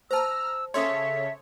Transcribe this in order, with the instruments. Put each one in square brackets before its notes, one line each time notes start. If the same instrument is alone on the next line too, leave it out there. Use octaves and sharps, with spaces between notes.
[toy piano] C5 A5 [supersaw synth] A#5 F6 [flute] E6
[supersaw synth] C#3 A4 C#5 [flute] E5 [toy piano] C6 D#6